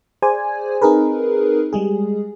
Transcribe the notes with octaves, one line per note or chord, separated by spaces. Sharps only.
G#4 C5 D5 G#5
C4 D#4 G#4 A#4 B4
G3 G#3 G#4